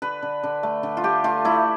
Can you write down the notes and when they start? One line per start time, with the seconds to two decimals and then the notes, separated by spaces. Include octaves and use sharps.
0.02 D3 B4
0.22 D3
0.43 D3
0.63 A3
0.83 D3
0.97 F4
1.04 A3 G4
1.24 A3 F4
1.45 A3 E4